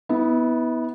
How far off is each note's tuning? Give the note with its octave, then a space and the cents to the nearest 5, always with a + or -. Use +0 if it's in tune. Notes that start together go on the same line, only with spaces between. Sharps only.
B3 +0 E4 -35